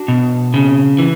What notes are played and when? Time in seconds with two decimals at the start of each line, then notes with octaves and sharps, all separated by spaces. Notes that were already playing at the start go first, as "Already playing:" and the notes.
Already playing: D4 F#4
0.08 B2
0.54 C#3
0.98 E3